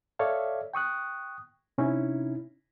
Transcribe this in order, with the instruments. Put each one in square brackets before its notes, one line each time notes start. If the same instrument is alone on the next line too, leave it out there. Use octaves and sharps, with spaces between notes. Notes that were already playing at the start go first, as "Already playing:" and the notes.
[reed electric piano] A4 C#5 D5 E5 F5
G5 C#6 D#6 F#6
C3 C#4 D#4 E4